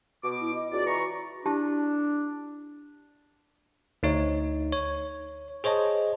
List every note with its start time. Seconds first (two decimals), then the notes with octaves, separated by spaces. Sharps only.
0.24 B2 D6
0.41 E4
0.54 D#5
0.72 C#2 F#4 D5
0.86 E3 A#5 C#6
1.46 D4 E4 G4 A5
4.03 D2 D#4 C#5
4.73 C#5
5.64 G#4 C5 C#5 D#5 A5